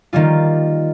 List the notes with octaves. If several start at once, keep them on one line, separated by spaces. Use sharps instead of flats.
D#3 G3 A#3 F4